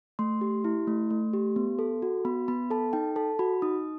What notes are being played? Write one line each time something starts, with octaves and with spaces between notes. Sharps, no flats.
A3 C6
G4
E4
A3
A3
G4
B3
A4
F#4
B3 B5
B3 B5
A4 A5
D#4 G5
A4 A5
F#4 B5
D#4 D#6